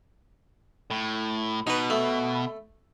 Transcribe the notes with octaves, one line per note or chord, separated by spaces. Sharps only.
A2
B2 D#4 B4
A3